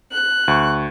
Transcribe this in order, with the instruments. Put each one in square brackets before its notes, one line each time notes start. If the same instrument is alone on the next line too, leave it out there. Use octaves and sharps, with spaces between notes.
[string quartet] F#6
[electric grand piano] D2 C#6